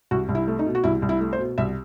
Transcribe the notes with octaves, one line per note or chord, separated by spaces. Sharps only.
C2 F#4
C2
E4
A3
D#4
B2
F#4
C2 E4
C2
E4
A3
C5
B2
C2 E5